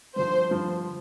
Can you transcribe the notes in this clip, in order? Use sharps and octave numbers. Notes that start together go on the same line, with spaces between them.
G2 D3 F3 C5
G2 D3 F3